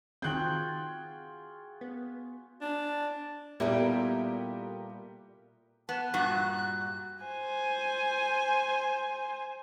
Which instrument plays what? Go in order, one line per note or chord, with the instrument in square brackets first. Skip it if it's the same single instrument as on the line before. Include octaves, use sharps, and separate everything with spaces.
[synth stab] D#3 C4 [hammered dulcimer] F4 F#4 G#4 [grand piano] G5 F#6 G6
[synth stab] B3
[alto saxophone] D4
[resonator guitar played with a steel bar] A#2 G3 [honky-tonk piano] B3 G4 A#4 [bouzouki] E4 A4 D5
[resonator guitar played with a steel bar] B3 [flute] A5
[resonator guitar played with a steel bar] G2 A#2 F#4 [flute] F#6
[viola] C5 G#5